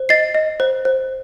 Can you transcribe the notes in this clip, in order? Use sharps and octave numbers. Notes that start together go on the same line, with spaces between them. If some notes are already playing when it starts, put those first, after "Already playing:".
Already playing: C5
D#5 A6 C7
D#5
C5
C5